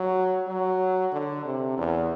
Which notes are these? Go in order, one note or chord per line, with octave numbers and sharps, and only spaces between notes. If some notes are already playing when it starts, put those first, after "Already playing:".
Already playing: F#3
F#3
D3
C3
E2